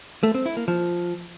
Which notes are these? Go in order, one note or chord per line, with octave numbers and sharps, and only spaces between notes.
A3
C4
E4
A#3
F3